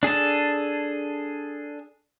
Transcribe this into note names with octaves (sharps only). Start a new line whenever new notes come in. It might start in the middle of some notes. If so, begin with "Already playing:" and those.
D4 G#4 A4 A5